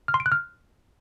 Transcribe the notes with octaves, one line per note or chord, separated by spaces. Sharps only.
F6
C6
D7
F#6
F6